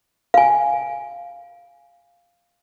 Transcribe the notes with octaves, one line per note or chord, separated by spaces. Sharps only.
F5 G#5